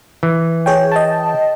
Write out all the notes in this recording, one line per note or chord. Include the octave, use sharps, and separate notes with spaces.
E3
G#4 C#5 G5
D#5 G5 A5